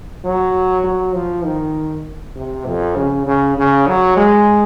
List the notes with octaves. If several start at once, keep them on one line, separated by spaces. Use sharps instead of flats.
F#3
F#3
F3
D#3
C3
F2
C#3
C#3
C#3
F#3
G#3